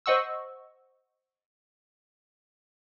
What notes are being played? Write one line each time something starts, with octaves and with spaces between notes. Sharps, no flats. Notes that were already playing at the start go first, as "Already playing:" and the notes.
C5 D#5 F#5 C#6 E6